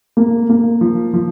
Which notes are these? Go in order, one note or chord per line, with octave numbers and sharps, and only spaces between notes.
A#3
A#3
F3
F3